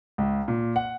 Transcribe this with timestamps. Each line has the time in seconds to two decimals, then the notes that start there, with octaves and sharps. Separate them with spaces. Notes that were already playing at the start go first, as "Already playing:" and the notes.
0.18 C#2
0.48 A#2
0.76 F#5